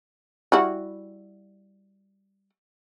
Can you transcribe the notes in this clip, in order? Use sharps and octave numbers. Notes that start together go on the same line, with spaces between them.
G3 E4 F#4